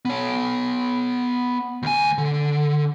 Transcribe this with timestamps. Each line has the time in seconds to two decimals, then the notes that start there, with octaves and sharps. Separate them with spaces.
0.05 B3 C#5
1.83 D2 G#5
2.18 D3